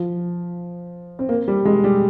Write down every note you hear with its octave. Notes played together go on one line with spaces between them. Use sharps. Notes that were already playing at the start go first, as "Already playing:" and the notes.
Already playing: F3
C4
A#3
G3
G#3
G3